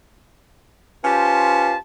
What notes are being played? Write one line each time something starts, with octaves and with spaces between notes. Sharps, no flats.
C#4 F4 G4 B4 C5 A5